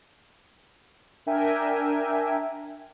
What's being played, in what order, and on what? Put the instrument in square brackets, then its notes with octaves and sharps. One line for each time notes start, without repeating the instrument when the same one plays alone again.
[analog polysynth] D4 A#4 E5 G5 G#5